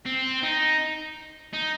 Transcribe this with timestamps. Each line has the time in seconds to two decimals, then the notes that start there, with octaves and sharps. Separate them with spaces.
0.06 C4
0.43 D#4
1.53 D#4